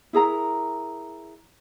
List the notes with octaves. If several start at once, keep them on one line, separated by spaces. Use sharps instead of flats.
E4 G#4 A#4 A#5